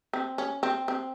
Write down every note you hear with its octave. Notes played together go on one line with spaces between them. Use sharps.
C4
C#4
C4
C4